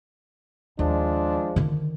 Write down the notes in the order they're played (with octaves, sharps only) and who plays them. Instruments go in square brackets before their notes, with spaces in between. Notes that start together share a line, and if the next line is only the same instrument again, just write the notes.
[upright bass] D#2 [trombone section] F3 G#3 D4
[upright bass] D3 D#3